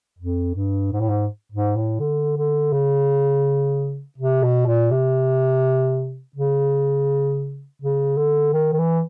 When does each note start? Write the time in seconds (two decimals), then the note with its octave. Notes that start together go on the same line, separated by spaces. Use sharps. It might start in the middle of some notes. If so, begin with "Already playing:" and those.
0.19 F2
0.55 G2
0.92 G#2
1.00 A2
1.09 G#2
1.52 G#2
1.76 A2
2.00 D3
2.37 D3
2.73 C#3
4.18 C3
4.43 B2
4.67 A#2
4.91 C3
6.36 C#3
7.82 C#3
8.18 D3
8.53 D#3
8.73 D#3
8.79 E3